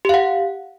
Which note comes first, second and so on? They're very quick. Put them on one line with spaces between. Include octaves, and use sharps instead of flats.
G4 F5 F#5